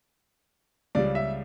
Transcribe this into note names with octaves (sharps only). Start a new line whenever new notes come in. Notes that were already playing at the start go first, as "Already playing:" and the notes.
C#2 C#3 G3 D5
E5